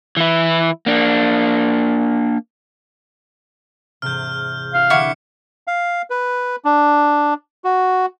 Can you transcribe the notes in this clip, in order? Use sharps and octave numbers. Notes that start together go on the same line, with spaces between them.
E3 E4
A#3 D4
E2 G#2 C3 F6 G6
C4 E4 G4 F5
D3 E3 E4 D5 F#5 C#6 D6 C#7
F5
B4
D4
F#4